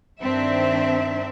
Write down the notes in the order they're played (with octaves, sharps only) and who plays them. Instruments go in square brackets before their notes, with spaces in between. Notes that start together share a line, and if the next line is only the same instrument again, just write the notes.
[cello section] G2 D#3 C4 D4 E5